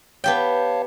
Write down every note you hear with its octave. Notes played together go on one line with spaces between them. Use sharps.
B3 G4 C#5 F5 G5 A5